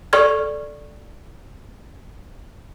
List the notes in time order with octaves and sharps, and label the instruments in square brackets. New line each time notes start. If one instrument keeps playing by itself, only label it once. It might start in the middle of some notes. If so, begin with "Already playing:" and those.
[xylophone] A4 D5 C#6 F6 G#6